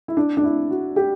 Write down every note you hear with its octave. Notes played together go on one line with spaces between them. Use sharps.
E4
D4
D4
E4
F#4
G4